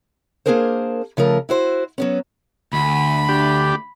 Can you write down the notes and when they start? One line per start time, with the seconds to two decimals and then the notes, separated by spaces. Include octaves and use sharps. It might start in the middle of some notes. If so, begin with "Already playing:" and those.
0.46 A#3 B3 D4 G#4 A#4 C5
1.17 C#3 F3 A3 A#4
1.49 E4 F#4 C5
1.98 F#3 B3 C#4
2.73 D2 B5
3.29 D4 G4